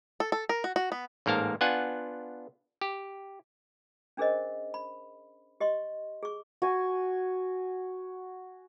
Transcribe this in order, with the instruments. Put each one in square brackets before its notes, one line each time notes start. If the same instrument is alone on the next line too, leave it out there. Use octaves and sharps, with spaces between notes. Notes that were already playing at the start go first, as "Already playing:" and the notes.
[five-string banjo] A4
A4
A#4
F#4
F#4
B3
[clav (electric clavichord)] A1 G#2 A#3 A#4 A5
B3 D4 F4 F#5 G#5
G4
[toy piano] C#4 D4 G#4 A#4 C5 D#5
B5
G4 D#5 C6 C#6
G#4 C#6
[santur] F#4 G#5